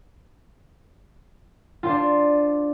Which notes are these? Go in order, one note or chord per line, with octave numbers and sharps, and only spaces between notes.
D4 F4 C5